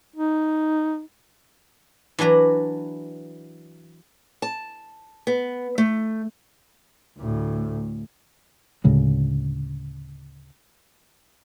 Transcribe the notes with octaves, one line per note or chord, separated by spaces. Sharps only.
D#4
E3 F#3 D4 B4 A#5
A5
B3
A3
D2 A2
D2 A2 C#3 G#3